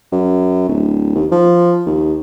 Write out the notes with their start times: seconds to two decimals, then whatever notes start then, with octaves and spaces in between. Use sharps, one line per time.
0.12 F#2
0.68 D1
1.15 D#2
1.32 F3
1.86 D#2